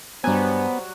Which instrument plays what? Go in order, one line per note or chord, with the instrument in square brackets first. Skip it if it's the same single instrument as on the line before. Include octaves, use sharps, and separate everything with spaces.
[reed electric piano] G2 G#5 [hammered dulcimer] F#3 G3 [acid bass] B3 [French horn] C5